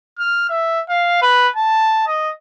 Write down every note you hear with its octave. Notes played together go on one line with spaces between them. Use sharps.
F6
E5
F5
B4
A5
D#5